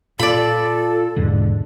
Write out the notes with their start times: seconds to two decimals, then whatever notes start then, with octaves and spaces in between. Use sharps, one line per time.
0.19 A#2 F4 A4 D5 B5
1.16 B1 E2 G#2 D3